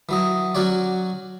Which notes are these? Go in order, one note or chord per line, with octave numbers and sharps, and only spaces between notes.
E3 F#3 D#5
F#3 C#4 F#4 C#5 D5